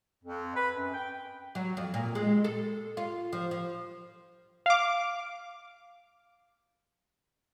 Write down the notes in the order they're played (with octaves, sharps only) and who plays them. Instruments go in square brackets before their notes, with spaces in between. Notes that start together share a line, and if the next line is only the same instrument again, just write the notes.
[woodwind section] F2
B4
F#2
G5
[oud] F#3
F2
A#2
G#3
A4
F4
F3
F3
[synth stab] F5 D6